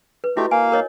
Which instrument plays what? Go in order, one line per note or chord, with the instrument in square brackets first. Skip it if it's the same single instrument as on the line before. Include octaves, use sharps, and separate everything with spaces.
[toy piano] B4
[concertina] A3 G4 [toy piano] E4 F#4 D#5
[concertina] A#3 F5 [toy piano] G#5
[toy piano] A#4 C#5 D#5